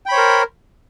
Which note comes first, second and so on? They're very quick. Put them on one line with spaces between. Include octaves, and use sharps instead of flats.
G5 B5 C#5 C5 A#4